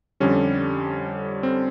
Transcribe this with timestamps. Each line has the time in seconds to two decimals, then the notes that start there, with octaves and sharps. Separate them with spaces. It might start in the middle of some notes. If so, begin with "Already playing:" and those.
0.20 F2 D3 G3 C#4
1.43 C4